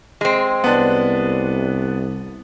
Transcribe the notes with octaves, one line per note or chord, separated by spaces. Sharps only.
G#3 C4
C2 B3 D4